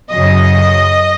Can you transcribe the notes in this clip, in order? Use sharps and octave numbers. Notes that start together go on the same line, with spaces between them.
F#2 C#3 F#3 D#5